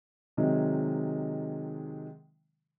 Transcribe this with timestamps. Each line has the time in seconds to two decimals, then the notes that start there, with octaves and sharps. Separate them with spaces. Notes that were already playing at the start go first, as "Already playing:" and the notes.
0.37 C3 D#3 F#3 G#3